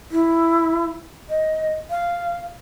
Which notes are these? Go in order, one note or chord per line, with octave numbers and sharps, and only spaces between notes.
E4
D#5
F5